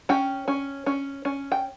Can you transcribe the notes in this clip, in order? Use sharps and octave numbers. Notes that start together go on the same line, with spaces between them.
C#4 G5
C#4
C#4
C#4
G5